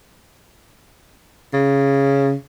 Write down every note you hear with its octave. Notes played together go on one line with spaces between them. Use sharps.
C#3